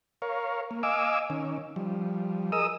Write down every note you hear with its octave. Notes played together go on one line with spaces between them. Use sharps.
A#4 C#5 F5
A#3
D#5 F5 G#5 D6 E6
D#3 C#4
F3 G3
G#4 A#4 D#5 D#6 E6